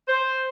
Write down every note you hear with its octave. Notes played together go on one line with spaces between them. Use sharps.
C5